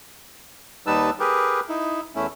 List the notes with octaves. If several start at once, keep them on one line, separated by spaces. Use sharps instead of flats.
D#2 G3 D#4 B4 A5 E6
G4 G#4 A#4 B4
D#4 E4
E2 A3 C#4 E4